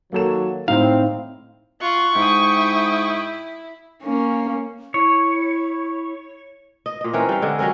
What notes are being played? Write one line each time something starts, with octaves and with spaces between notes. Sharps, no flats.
D#3 F#3 A#3 A4 E7
A2 C4 D#4 F5
F4 F#5 C#6
G#2 E4 G5 D#6
A#3 C#4
E4 C#5
D#5
A#2 D#5
E3 C4 C#4 A#4
G3 F5
D3 G#3
F#3 G3 C#4 A#4